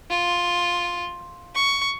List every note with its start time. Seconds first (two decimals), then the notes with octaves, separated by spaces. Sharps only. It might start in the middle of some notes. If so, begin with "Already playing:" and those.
0.10 F4
1.55 C#6